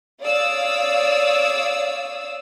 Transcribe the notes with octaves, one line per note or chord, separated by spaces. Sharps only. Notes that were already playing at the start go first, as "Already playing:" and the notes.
C#5 D5 F5 D#6 E6